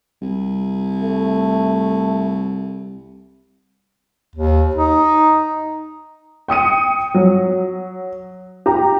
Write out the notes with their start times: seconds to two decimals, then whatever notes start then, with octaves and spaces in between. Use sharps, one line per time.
0.22 C2
1.00 A3
4.36 D#2
4.76 D#4
6.48 G5 D#6 C#7 D#7
7.14 F#3
8.66 G4 A#5